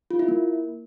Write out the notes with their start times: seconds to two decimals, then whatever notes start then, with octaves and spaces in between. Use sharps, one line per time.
0.11 F4
0.19 E4
0.28 A#3